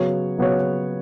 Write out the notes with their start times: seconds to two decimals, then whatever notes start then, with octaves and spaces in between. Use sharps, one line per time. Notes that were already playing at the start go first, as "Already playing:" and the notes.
Already playing: C#3 F#3 B3 F#4 C#5
0.38 C#3 F#3 B3 F#4 C#5